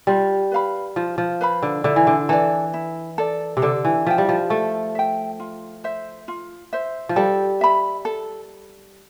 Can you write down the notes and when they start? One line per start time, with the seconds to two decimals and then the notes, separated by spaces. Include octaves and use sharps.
0.07 G3 F4
0.52 B4 F5 B5
0.96 F3 F4
1.18 F3
1.41 B4 F5 B5
1.63 D3
1.84 D3 E4
1.96 E3
2.07 D3
2.29 E3 A4 D5
2.74 E4
3.18 A4 D5
3.57 C3
3.62 D3 A4
3.85 E3
4.06 F3 E5 G5
4.18 G3
4.29 F3
4.50 A3 A4
4.95 E5 G5
5.40 F4
5.84 C5 E5
6.28 F4
6.73 C5 E5
7.09 F3
7.16 G3 A4
7.61 E5 B5
8.05 A4